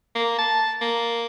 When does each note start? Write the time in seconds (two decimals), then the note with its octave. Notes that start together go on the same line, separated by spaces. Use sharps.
0.15 A#3
0.38 A5
0.81 A#3